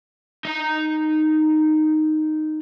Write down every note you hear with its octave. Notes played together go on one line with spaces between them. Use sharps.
D#4 A#5